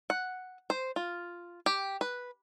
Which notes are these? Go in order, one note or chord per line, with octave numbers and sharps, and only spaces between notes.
F#5
C5
F4
G4
B4